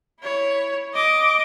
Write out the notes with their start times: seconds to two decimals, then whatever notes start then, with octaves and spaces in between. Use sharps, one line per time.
0.20 E4 C#5
0.93 D#5 D6